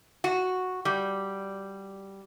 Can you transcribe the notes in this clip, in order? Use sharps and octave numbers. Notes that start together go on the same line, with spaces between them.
F#4
G3